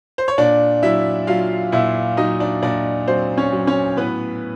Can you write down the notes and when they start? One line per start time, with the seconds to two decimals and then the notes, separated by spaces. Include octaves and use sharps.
0.18 C5
0.28 C#5
0.38 A#2 D4 D5
0.83 F#3 E4 E5
1.27 F#3 F4 F5
1.72 A#2 E4 E5
2.17 F#3 D#4 D#5
2.40 D4 D5
2.63 A#2 D4 D5
3.07 F#3 C4 C5
3.38 C#4 C#5
3.52 F#3
3.67 C#4 C#5
3.97 A2 B3 B4